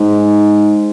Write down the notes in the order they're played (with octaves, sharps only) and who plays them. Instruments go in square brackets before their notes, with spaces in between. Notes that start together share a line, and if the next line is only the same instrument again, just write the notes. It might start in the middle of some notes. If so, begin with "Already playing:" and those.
Already playing: [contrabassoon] G#2